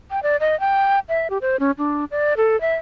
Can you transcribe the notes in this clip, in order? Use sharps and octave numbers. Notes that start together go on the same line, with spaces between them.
G5
D5
D#5
G5
E5
G4
C5
C#4
D4
D5
A4
E5